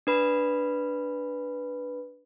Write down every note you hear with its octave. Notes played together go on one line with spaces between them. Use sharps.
D4 B4 B5